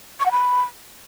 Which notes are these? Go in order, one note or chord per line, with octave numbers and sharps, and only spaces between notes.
C#6
F#5
B5